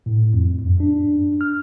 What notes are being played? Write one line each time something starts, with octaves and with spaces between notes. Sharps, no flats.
A2
F2
F#2
D4
F6